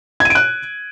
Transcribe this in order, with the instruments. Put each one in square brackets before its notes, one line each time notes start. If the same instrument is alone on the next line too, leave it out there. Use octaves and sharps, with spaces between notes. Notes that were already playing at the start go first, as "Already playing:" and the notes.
[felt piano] G#6
D#7
D7
F#6